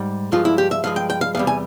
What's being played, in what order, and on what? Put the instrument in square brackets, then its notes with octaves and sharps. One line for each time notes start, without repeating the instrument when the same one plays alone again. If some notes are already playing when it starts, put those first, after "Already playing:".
Already playing: [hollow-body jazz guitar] G#2 G3
G2 F3 G#3 F4
E4
G4
E5
G2 F3 G#3 F5
G5
G5
F5
E2 C3 G3 F5
G#5